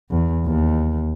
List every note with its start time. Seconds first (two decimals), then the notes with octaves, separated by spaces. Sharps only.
0.11 E2
0.46 D#2